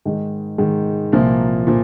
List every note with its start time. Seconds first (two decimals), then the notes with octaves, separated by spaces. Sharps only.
0.05 G#2 D#3 G#3
0.58 G#2 D#3 G#3
1.12 C2 A#2 F3 A#3
1.67 A#2 F3